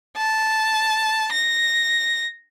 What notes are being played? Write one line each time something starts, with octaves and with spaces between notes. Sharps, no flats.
A5
A#6